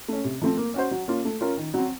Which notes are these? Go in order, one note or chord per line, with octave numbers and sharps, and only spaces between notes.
A3 C#4
C3
F3 A3 C4
A#3
C#4 F#4 C5
F#3
A#3 C#4 F4
A3
C#4 F4 A#4
D#3
F#3 C4